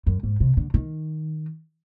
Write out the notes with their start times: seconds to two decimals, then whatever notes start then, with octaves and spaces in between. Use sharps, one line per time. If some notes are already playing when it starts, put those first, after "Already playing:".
0.07 F#2
0.23 G#2
0.40 C3
0.57 D3
0.74 D#3